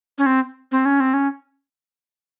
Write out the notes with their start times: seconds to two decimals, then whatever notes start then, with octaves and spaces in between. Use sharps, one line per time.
0.18 C#4
0.26 C4
0.72 C4
0.85 C#4
1.00 C4
1.14 C#4